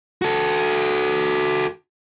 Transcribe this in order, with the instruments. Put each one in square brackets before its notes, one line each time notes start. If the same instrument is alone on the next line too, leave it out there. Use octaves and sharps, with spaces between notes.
[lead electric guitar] F#4 A4